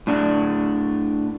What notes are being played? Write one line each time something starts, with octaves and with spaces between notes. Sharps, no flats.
A2 D4